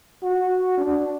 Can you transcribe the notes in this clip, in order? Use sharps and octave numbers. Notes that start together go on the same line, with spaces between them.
F#4
D4